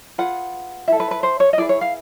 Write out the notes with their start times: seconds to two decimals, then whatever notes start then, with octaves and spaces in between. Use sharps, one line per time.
0.18 F4 G#4 B4 F#5
0.88 E4 A4 E5
1.00 B4
1.11 B4
1.23 C5
1.40 C#5
1.53 D#5
1.58 E4 G#4 B4 D5
1.69 C#5
1.81 F5